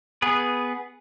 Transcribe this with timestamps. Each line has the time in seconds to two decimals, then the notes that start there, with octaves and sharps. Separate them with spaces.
0.22 B3 G#4 B4